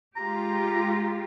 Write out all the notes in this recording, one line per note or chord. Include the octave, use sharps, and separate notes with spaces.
G#3 F4 G4 A#5